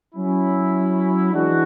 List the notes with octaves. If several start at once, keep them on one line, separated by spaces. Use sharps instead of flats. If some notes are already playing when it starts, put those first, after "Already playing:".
F#3 C#4 E4
E3 G#3 D4 F#4